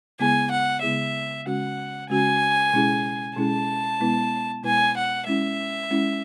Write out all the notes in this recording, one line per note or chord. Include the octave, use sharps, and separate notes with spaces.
C#3 G#3 B3 E4 G#4 G#5
F#5
C#3 G#3 B3 E4 G#4 E5
C#3 G#3 C#4 F#4 F#5
C#3 G#3 C#4 F#4 G#5
B2 G#3 C#4 E4 G#4
B2 G#3 C#4 E4 G#4 A5
B2 G#3 B3 E4 B4
B2 G#3 B3 E4 B4 G#5
F#5
G#3 C#4 E4 E5
G#3 C#4 E4